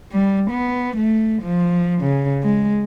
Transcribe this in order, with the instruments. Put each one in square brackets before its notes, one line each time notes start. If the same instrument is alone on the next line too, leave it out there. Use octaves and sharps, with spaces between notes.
[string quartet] G3
B3
A3
F3
C#3
G#3